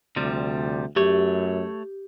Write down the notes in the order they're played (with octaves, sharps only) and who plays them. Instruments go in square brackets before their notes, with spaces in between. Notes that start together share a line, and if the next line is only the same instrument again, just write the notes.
[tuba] D2 [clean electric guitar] C3 F3 G3
[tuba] F#2 [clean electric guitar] A3 C#5 [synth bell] G4